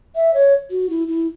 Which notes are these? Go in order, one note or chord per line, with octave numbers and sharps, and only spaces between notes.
E5
C#5
F#4
E4
E4